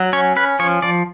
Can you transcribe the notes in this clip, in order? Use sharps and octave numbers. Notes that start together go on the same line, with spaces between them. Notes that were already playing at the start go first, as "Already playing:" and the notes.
Already playing: F#3
C#4 C#5
C#4 B4
F3 C#5
F3 D5